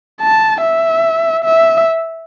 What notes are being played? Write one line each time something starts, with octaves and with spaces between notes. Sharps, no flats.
A5
E5
E5